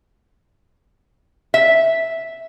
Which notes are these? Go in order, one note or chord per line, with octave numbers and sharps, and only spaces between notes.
E5